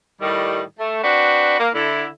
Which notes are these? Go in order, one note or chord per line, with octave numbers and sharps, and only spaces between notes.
A2 D#3 G3
A3
C4 D4 F#4 B4
A#3
D3 E4